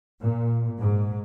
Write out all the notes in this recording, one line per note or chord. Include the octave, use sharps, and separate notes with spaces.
A#2
G#2